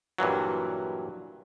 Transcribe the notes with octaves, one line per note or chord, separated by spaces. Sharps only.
G2 A#2 E3 F#3